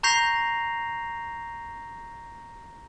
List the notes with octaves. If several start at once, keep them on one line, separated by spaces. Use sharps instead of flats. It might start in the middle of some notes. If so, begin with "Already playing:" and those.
A#5 C#6 G6 A#6 C7 F7